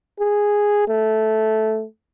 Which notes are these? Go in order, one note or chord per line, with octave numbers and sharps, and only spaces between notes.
G#4
A3